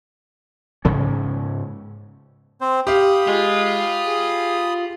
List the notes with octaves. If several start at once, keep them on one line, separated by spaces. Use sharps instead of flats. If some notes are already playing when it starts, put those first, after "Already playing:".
G#2 C#3 C#4
C4 C5
G4 F5 B5 D#6
G#3 F4
G#4